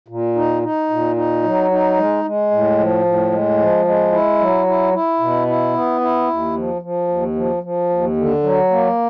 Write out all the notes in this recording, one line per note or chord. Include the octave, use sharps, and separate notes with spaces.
A#2
D#4
D#4
A#2
D#4
F#3
D#4
G#3
G#3
A2
F3
A2
G#3
F3
G#3
E4
F#3
E4
E4
B2
E4
B3
E4
D#2
F3
F3
D#2
F3
F3
D#2
D3
F#3
A#3